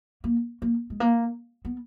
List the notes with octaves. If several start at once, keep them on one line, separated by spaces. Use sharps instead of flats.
A#3
A#3
G#3
A#3
B3